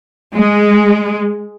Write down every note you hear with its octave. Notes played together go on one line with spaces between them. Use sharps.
G#3